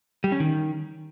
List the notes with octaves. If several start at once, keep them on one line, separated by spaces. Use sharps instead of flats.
G3
C#4
D#3